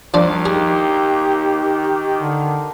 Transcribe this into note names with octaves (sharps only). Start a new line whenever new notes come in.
D#2 F3 G3 D4 C5
D#4 G4 G#4
D#3
D3